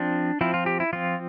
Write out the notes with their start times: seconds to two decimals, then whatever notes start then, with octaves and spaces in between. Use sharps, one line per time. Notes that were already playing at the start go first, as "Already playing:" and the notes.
Already playing: F3 C4 D4
0.41 F3 C4 E4
0.54 F4
0.66 G4
0.80 E4
0.93 F3 C4 F4